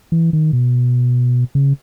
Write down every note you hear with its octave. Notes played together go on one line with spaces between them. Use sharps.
E3
D#3
B2
C#3